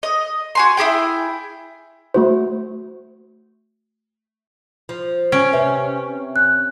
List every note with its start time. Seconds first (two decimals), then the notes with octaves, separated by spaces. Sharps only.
0.03 D#5
0.55 F#4 G#5 C6
0.77 E4 G4 G#4 G5
2.14 A3 F#4 C5
4.89 F3
5.32 C#4 D7
5.53 C3 B4 E5
6.36 F#6